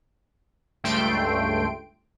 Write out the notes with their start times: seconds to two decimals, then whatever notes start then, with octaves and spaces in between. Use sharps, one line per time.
0.84 C#2 G2 A3 G5 C6 D7